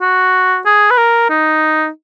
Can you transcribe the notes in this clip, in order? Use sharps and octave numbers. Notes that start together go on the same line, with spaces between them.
F#4
G#4
B4
A#4
D#4